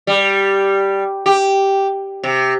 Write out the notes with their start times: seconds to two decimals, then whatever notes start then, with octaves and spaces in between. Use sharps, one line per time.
0.07 G3
1.26 G4
2.24 C3